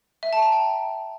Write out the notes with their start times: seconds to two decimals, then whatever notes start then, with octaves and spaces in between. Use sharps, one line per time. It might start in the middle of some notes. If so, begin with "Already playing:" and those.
0.23 E5
0.33 A5
0.42 A#5
0.52 G5